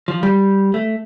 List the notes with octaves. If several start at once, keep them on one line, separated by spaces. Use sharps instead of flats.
F3
G3
A3